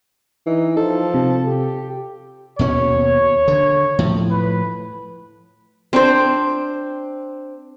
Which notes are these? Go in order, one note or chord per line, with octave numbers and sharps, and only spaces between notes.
E3 D#4
F3 D#4 A4
C3
G4
D#2 B2 C#4 C#5
D3
A2 F3
B4
C4 D4 C5